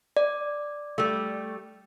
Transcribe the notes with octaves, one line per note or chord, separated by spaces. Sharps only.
D5
G3 A3